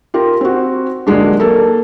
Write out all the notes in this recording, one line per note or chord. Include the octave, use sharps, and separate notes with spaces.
F4 G4 A#4
C4 F#4
A#2 D3 F#3 G#3 D4
A#3 A4